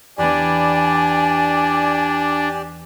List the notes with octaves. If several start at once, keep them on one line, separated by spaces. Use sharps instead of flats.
E2 B3 D4 G4 D5 G#5